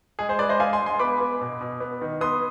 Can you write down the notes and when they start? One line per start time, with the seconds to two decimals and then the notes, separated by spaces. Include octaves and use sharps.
0.19 G#3 G#4
0.29 G#4 C5
0.39 G#3 B4 D5
0.49 C5 D#5
0.60 G#3 F5 G#5
0.73 G#5 C6
0.79 G#3
0.86 G#5 C6
0.99 B3 B5 D6
1.20 B3
1.41 B2
1.61 B2
1.81 B3
2.01 D#3
2.21 B3 C6 D#6